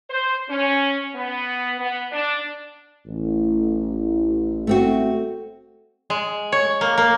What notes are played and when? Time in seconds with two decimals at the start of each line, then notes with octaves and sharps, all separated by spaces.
0.10 C5
0.49 C#4
1.15 B3
1.80 B3
2.11 D4
3.07 A1
4.67 A3 C4 F#4
6.10 G#3
6.52 C#5
6.81 A#3
6.98 A#3